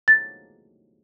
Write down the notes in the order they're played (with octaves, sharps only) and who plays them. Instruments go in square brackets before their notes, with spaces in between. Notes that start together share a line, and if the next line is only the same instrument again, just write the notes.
[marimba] A6